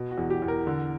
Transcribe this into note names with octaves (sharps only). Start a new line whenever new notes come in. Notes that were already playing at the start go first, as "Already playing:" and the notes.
Already playing: B2
F#4
E2
G4
E2
A#4
D3